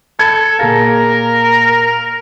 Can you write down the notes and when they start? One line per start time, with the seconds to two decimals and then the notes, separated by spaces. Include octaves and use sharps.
0.19 A4 B5 G#6 C#7
0.59 A#2 G#4 A#4 F5